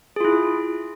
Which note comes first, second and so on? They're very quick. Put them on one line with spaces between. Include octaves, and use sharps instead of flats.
G#4 F4 E4